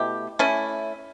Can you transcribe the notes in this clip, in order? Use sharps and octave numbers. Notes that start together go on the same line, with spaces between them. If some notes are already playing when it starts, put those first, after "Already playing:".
Already playing: B2 A3 E4 G4
A3 C#4 E4